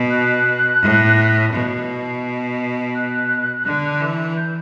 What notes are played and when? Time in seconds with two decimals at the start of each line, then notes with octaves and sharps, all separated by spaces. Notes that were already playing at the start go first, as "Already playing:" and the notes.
Already playing: B2
0.11 F#6
0.82 A2
1.53 B2
2.95 F#6
3.66 D3
4.01 E3
4.37 G6